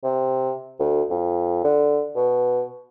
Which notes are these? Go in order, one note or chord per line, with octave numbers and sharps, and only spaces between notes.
C3
D2
F2
D3
B2